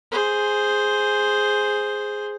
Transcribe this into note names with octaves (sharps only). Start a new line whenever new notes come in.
G#4 C5